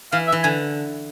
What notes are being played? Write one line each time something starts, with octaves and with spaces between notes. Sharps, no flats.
E3 F5
E5
E3
D3 G#5